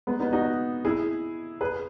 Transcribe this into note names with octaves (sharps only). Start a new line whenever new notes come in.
G#3 B3
B3 D#4
D#4 F#4
E4 G#4
G#4 B4